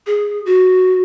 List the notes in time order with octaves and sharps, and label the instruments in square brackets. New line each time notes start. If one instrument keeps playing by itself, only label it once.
[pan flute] G#4
F#4